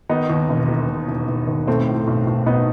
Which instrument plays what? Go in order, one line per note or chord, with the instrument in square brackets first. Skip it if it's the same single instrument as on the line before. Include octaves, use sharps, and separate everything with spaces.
[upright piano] D#3 B3 D#4
D#2
E1
D#3
E1
E1
E1
D#2
B1 A3 C4
A2
B1
B1
B1 B3 D#4